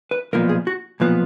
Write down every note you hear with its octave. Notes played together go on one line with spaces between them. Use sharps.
B4
B1 A#2 F3 B3 A#4
G#4
F#4
B1 A#2 F3 B3 B4